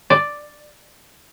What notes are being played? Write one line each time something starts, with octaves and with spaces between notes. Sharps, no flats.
D5